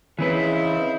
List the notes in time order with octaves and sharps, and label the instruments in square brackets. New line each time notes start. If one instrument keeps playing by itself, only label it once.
[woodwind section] C#3 [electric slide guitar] E3 C4 B4 [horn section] D#4 E4 C5